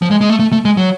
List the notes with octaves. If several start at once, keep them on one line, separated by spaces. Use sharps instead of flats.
F3
G#3
G#3
A3
A3
A3
G#3
F#3